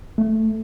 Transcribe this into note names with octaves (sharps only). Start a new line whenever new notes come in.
A3